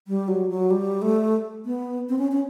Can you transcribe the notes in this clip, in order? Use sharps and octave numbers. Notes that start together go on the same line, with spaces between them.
G3
F#3
F#3
G3
A3
B3
C4
C#4
C#4